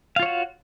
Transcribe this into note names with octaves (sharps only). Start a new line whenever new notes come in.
F4 F#4 C#5 F5